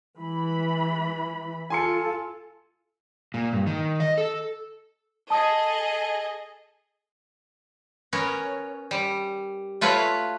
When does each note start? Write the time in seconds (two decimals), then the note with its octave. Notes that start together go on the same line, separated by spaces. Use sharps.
0.19 E3 B5
1.70 F4 A4 G#5 C6 C#7
3.34 A#2
3.53 G2
3.67 D#3
4.00 D#5
4.18 A4
5.30 G#4 A4 D#5 A5 D#6
8.13 B3 C#4 A#4 C#5
8.91 G3
9.81 A3 F4 F#4 B4 C#5